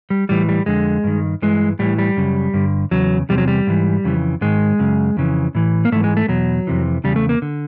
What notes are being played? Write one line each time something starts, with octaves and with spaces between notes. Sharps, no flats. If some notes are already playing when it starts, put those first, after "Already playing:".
G3
A2 E3 G3
G3
F2 D3 G#3
G2 D#3
G2 E3 G#3
A2 E3 G3
G3
F#2 C#3
G2 D3
E2 C#3 F#3
E2 C3 G3
F#3
G3
G#2 E3
F2 C#3 E3
G#2 D#3 G#3
F#2 C#3
F2 C#3 E3
A2 E3
A#3
G#2 E3 A3
G#3
A3
E2 B2 F#3
F2 C3 E3
E2 C#3 G3
A3
A#3
D3